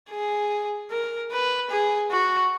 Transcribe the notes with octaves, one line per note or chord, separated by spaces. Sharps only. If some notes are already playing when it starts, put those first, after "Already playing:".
G#4
A#4
B4
G#4
F#4